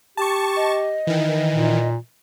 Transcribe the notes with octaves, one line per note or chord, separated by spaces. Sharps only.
G4 A5 C#6
D#5
D#3 E3
A#2